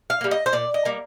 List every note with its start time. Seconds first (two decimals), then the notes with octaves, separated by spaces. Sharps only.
0.10 F5
0.21 G3 A#3
0.31 D#5
0.46 C5
0.53 A#2 D5
0.74 D#5
0.85 G3 A#3